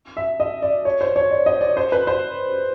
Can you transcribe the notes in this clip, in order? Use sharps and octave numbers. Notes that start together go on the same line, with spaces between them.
E5
D#5
D5
C#5
C5
C#5
D5
D#5
D5
C5
B4
C5